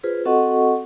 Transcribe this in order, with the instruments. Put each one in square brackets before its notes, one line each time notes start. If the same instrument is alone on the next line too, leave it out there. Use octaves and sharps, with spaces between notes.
[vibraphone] F4 G#4 B4 C5
C4 F#4 A4 D#5 F#5 C#6